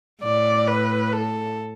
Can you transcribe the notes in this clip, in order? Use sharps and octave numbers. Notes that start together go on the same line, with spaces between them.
A2 D5
B4
A4